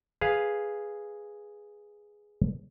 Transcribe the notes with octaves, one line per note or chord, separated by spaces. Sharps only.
G#4 B4 F5